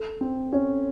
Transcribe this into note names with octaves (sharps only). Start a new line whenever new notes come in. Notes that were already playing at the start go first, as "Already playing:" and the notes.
Already playing: A4
C4
C#4